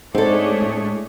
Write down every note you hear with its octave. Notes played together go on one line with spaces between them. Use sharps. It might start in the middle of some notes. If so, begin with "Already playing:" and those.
G#2 G#3 A3 C4 D4 G#4 A4 C#5
A2